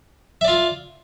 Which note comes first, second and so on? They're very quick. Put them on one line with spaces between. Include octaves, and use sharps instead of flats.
E5 D5 F4